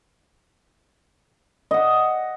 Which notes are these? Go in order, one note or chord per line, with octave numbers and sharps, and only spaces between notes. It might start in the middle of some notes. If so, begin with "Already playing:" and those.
D#5 F#5